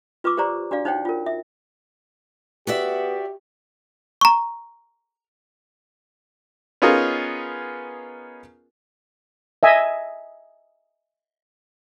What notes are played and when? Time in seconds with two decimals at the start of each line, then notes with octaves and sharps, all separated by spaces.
0.24 F4 B4 C#6 D6 E6
0.37 G4 B4 C5 D5 A#5
0.71 D4 F#4 D5 F5
0.85 D#4 C5 C#5 F#5 G5
1.05 F4 A#4
1.26 E5
2.67 B3 F#4 G4 D5 E5
4.21 A#5 C#6
6.82 B3 C#4 D#4 F4 G#4 A#4
9.63 D#5 E5 G#5